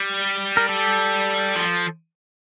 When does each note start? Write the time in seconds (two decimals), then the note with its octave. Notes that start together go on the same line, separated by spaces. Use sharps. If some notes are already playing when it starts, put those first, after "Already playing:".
Already playing: G3
0.57 A#4
0.69 A4
1.56 F3